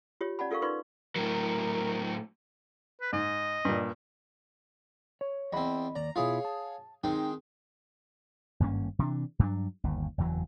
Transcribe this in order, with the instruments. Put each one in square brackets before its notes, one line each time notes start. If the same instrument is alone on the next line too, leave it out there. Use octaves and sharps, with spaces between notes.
[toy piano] F4 G4 C#5
C#4 D5 F#5 A5 B5
F4 A4 A#4 F5 C#6
D#4 F4 B4 D5 C6 C#6
[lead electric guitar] A2 F#3 [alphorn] A#4
[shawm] B4
[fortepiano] G#2 [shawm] D#5
[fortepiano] G2 A#2
[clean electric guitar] C#5
[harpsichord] E2 C4 [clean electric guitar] D#5 B5
[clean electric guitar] D#2 D5 [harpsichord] A#5
[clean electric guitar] B2 E4 F4 [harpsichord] G#4 C#5 F5
[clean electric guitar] A5
[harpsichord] D#3 G#3 C4 [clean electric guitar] D#4
[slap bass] G#1 G2 A#3 C#4
C3 E3 C4 D4
G2 F#3 C#4 D4
G1 D#2
F#1 E2 E3 F#3